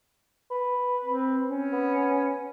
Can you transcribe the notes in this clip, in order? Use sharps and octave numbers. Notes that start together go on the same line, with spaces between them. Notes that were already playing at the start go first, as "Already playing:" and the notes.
B4
C4
C#4
B3